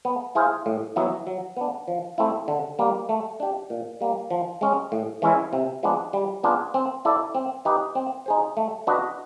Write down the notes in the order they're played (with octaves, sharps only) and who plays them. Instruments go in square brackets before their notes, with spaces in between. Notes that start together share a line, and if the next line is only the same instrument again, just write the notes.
[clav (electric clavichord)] B3
E4 G#4 C5 F5
A2
F#3 B3 E4
F#3
B3 D4
F3
A3 C4 E4
D3
G3 A#3
A3
D4 G4
A#2
G3 A#3
F3
G#3 C#4
A2
E3 G#3 C#4 E4
C3
F3 G#3 B3 D4
G3
B3 D4 F4 G#4
C4
E4 A4 D5
C4
D#4 G4 B4
C4
D#4 G#4 C5
A3
D4 F#4 B4 D#5